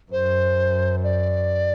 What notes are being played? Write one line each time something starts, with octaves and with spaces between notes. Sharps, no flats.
F#2 C5
D5